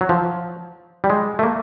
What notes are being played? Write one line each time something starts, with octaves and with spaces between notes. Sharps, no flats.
F#3
F3
G3
G#3
A3
A#3